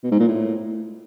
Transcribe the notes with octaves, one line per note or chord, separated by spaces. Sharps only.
B2
G#2
A#2
A2